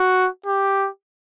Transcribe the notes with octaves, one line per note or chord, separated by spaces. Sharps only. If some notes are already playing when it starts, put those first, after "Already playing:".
Already playing: F#4
G4